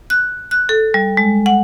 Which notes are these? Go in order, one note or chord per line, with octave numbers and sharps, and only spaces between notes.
F#6
F#6
A4
G3
G#3
F#5